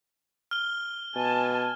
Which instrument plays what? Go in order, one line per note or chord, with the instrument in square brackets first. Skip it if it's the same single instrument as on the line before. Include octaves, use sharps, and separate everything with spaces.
[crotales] F6 G7
[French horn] B2 [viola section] G#5 A5